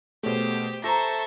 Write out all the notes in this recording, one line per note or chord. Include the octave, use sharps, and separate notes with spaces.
B2 A3 G4 G#4 C5 C#5
F4 A4 C5 E5 A#5 C#6 A#6